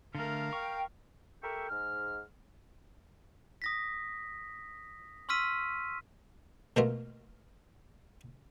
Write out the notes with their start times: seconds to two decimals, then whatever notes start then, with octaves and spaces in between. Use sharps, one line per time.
0.15 D3 A3 A#4 F5
0.53 G5 C#6
1.42 G4 A4 A#4 E5 G5 C#6
1.69 G#2 F6
3.62 D#6 A#6 B6
5.29 C6 C#6 E6 F6 B6 D#7
6.76 B2 A3 A#3 F4 A#4